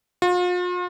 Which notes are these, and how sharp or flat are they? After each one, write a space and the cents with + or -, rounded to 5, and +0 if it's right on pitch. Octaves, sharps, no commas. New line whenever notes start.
F4 +40